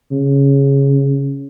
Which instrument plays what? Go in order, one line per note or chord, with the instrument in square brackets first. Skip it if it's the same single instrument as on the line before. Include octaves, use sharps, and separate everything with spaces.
[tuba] C#3